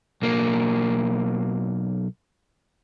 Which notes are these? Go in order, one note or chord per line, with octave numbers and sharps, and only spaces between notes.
B1 A#3